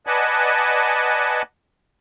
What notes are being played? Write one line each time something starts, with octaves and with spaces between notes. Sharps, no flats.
B4 D5 D#5 F#5 G#5 A5